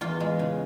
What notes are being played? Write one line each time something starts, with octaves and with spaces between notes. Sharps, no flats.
E2 F4
G#3
C#3